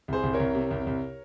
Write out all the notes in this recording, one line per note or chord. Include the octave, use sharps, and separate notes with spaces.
C2 G#4 C5
C2
A#4 C#5
C2
C3
C2
C2